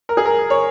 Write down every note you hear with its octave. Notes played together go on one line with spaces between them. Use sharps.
A#4
G#4
A#4
C#5